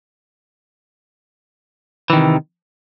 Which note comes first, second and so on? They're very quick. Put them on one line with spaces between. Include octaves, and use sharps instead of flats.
E3 D#3 C3